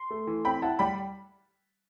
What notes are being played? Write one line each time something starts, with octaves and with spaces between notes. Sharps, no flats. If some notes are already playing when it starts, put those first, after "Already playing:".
Already playing: C6
A3
E3
C4 G5 B5
E4 F#5 A5
G3 G5 B5